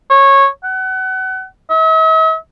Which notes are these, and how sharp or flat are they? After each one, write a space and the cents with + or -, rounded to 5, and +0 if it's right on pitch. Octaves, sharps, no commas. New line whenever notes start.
C#5 -15
F#5 +30
E5 -45